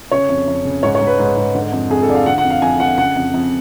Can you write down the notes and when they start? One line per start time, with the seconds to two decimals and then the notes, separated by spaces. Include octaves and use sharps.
0.11 C#3 C#5
0.29 F2
0.48 F2
0.65 C#3
0.83 G#2 C#5
0.95 C#5
1.01 G#2
1.07 B4
1.19 G#2
1.37 G#2
1.55 D3
1.72 F2
1.90 F2 G#4
2.03 A4
2.08 D3 D5
2.15 F5
2.26 D3 F#5
2.38 F#5
2.44 F2
2.50 F5
2.62 F2 G#5
2.80 D3 F#5
2.98 C#3 F#5
3.16 F2
3.34 F2